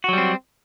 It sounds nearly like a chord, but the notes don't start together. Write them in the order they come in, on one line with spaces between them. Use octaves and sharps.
F#4 F#3 G3 C4